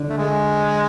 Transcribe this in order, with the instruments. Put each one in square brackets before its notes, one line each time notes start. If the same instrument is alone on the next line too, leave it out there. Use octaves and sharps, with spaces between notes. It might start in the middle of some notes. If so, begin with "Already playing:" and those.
Already playing: [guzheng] D3
[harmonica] A3
G#3